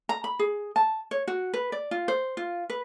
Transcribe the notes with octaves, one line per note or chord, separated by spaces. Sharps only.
A#5
B5
G#4
A5
C#5
F#4
B4
D5
F4
C5
F4
B4